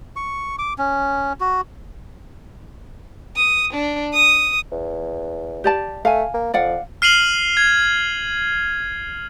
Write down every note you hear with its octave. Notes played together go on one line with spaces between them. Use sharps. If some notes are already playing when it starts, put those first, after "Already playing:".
C#6
D6
C#4
F#4
D#6
D4
D#6
E2
G4 D5 A5
A3 F5 G#5
A#3
F2 D5 F5 F#5
F6 C7 D#7 F7 F#7
G#6